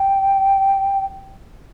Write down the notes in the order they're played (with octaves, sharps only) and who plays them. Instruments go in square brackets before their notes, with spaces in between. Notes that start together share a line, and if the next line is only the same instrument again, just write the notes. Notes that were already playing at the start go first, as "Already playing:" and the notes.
Already playing: [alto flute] G5